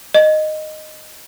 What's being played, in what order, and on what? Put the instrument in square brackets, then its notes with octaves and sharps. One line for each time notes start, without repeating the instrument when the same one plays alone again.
[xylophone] D#5